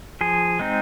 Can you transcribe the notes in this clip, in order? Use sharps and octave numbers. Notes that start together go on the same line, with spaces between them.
F3 G#4
G#3 C4 D#4